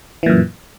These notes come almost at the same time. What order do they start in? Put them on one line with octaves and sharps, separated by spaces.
E3 A#2 F#2